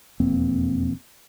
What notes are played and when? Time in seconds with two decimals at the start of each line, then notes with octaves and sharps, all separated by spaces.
0.20 E1 F2 A#3 C4